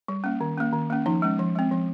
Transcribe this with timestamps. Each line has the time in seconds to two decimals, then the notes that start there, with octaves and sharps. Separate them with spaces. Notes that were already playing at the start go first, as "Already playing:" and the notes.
0.08 G3
0.24 A#3 C#4
0.41 D#3
0.58 A#3 C#4
0.73 D#3
0.90 A#3 C#4
1.06 F3 D#4
1.22 G#3 C#4
1.39 F3
1.56 G#3 C4
1.71 F3